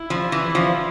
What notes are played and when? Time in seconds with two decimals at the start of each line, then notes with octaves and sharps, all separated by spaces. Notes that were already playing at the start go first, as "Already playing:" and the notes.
Already playing: E4
0.10 F3
0.32 E3
0.55 F3